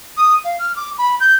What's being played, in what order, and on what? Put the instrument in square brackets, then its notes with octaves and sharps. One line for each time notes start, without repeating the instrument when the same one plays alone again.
[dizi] D#6
F5
F6
D6
B5
G6